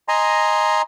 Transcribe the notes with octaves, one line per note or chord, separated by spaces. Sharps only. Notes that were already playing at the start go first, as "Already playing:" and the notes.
D#5 G#5 A#5 C6